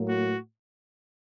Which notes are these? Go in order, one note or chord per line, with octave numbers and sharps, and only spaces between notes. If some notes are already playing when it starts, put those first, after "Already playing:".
Already playing: A2 F#3 A#3
F#4